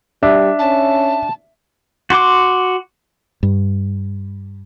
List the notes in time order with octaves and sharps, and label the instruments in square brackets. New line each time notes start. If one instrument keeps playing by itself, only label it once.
[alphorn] G3 [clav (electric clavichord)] D4 [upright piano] E5
[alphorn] C#4 [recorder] A5
[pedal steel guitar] F#4 C6 D6
[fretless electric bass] G2